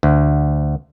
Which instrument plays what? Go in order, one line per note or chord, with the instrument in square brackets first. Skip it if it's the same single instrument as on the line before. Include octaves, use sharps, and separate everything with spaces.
[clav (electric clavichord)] D2